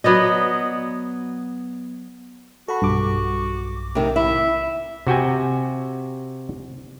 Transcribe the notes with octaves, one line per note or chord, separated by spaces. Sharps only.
F#3 B3 D5 D#5
F#4 A4 F#5 B5
B1 G2 D6
C3 D#3
E4 E5
C3 F#4 G5 G#5